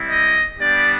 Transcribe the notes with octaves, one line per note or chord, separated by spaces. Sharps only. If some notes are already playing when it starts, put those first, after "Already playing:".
Already playing: G3 C4 E4
D#5
G3 B3 D4 G4 D5